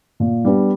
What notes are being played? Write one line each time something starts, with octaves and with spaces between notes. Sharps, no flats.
A#2
G3 B3 D4